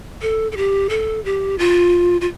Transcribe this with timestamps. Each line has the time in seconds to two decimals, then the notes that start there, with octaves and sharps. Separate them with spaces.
0.22 A4
0.52 A4
0.57 G4
0.90 A4
1.25 G4
1.59 F4
2.21 F4